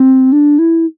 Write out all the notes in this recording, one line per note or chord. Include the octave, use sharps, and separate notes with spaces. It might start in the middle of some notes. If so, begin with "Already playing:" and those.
Already playing: C4
D4
E4